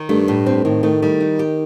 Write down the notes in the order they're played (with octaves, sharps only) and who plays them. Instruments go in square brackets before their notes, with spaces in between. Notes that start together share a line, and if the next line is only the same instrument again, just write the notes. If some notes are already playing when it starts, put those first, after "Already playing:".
Already playing: [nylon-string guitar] D#3
[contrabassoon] G2 [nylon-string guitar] A3
[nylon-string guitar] A2
C4
[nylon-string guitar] A2 [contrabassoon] D#3
[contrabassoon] D#3 [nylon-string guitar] A3
[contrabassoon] D#3 [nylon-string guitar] G3
[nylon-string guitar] D#4
G4